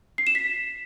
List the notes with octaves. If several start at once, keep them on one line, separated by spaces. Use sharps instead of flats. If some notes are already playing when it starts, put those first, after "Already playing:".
C7
E7
B6